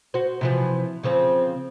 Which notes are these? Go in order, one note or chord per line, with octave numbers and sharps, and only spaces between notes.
F#4 C5
C3 E3 F3
C#3 F3 C4